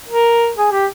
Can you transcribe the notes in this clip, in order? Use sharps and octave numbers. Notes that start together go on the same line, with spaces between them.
A#4
G#4
G4